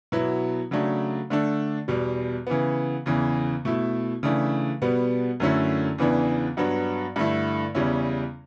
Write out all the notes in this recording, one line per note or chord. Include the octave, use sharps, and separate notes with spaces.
B2 F#3 B3 E4
C#3 F#3 A3 D4
D3 A3 D4
E2 B2 G3
C#3 E3 B3
E2 C#3 E3
B2 A3 E4
C#3 E3 A3 D4
B2 G3 B3
F#2 D3 A3 C#4 E4
E2 C#3 E3 B3 D4
G2 F#3 B3 D4
G2 D3 A3 E4
E2 C#3 G3 C#4 E4